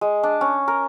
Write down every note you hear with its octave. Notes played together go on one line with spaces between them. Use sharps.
G#3
D4
C#4
A#4